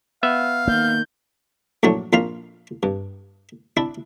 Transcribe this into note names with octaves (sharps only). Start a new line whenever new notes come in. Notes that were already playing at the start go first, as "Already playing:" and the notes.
B3 E5 F5
D#3 A#3 G6
A#1 A2 F#3 D4 C#5
A#1 A#2 F4 F5 A#5
G2
D4 E4